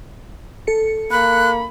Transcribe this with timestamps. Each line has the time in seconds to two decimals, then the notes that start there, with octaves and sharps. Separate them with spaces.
0.67 A4 C#7
1.11 A#3 B5 F#6